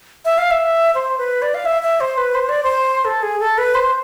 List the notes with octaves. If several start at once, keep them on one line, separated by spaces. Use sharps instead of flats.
E5
F5
E5
C5
B4
D5
F5
E5
E5
C5
B4
C5
D5
C5
A4
G#4
A4
B4
C5